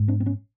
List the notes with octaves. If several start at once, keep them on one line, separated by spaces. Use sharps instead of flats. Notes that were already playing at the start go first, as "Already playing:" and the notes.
Already playing: G#2
C4 D4
C4
B3 C#4